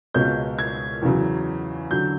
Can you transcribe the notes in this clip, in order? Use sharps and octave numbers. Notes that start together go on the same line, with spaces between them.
C#2 B2 G#3 C#4 G6
G#6
E2 C#3 F#3
D3 F#3 G6